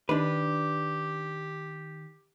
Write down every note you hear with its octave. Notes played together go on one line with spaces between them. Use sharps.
D#3 D4 G4 B4